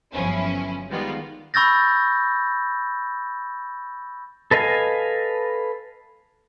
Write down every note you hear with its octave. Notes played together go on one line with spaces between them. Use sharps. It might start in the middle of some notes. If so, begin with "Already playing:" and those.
G1 F3 F#3 C#4 E4
D#3 G3 G#3 B3 F4 D5
B5 C#6 E6 G6 A6 A#6
A4 B4 D#5 F5 G#5